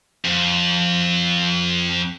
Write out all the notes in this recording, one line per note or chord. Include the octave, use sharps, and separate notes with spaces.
F2